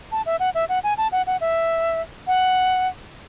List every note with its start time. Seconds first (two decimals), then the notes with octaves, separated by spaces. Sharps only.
0.12 A5
0.26 E5
0.40 F#5
0.55 E5
0.69 F#5
0.84 G#5
0.98 A5
1.12 F#5
1.27 F#5
1.41 E5
2.27 F#5